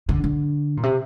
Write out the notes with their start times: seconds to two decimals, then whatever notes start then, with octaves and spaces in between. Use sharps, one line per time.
0.09 D3
0.24 D3
0.77 A#2
0.83 C3